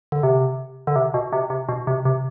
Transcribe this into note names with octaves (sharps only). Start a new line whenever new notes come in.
D3
C3
D3
C3
B2
C3
C3
B2
C3
C3